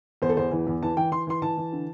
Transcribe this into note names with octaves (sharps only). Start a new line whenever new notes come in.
E2 C5
A4
E2 C5
E3
E2
E3 A5
E3 G5
E3 C6
E3 C6
E3 A5
E3
D3